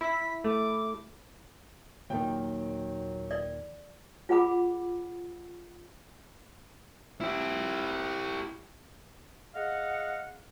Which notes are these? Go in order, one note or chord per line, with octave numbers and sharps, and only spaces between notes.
E4 B6
A3 D6
D#2 A#2 D#3 F#3 G5
D5
F4 G#4 F#5 B5 D6
E4 G4
G#4 D#5 F5 F#5